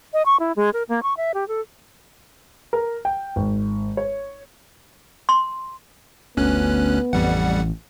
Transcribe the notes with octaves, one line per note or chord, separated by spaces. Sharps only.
D#5
C#6
E4
G#3
A#4
A#3
C#6
E5
G4
A4
A#4
G5
G#1
C#5
C6
G1 D2 B3 C#4 F#6
A1 F2 G3 F#5